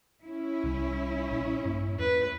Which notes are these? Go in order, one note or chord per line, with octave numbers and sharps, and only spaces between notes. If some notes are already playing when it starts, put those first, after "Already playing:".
C#4 E4
C2 F#3 G3
A#1
G2 A#3
E2 B4